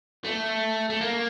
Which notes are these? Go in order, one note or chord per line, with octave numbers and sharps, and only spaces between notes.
A3
A3
A#3